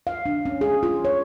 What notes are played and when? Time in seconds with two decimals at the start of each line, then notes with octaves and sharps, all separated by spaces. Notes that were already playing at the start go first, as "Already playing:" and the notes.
0.07 F5
0.26 D4
0.45 C#4
0.61 G#4
0.83 F4
1.05 C#5